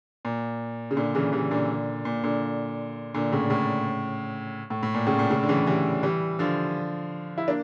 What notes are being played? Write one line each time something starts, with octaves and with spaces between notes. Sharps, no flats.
A#2
C#3
A#2 D3
C#3 E3
E3 G3
A#2 D3
A#2
A#2 D3
A#2 D3
A2 C#3
A2 C#3
A2
A2
A#2
A2 C#3
A#2
A2 C#3
D3
C#3 E3
E3 G3
E3 G3
D3 F3
E4
A#3 D4